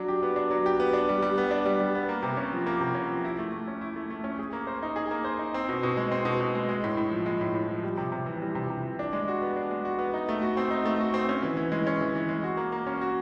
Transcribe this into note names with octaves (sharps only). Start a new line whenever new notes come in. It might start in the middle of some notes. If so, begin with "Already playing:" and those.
Already playing: F#3 D4
G4
B3
D4
F#3
G4
B3
D4
G3
G3
B3
D4
G3
G3
B3
A#3
C3
C#4
F3
A#3
C3
C#4
F3
E4
A3
A3
C#4
E4
A3
A3
C#4
G#4
A#3
C5
D#4
G#4
A#3
C5
D#4
C4
B2
B2
G#3
C4
B2
B2
G#3
G#3
A2
A2
F3
G#3
A2
A2
F3
G3
C3
C3
E3
G3
C3
C3
E3
D4
G#3
F#4
B3
D4
G#3
F#4
B3
D#4
A3
F#4
C4
D#4
A3
F#4
C4
C#4
E3
E3
G#3
C#4
E3
E3
G#3
F#4
A#3
A#3
C#4
F#4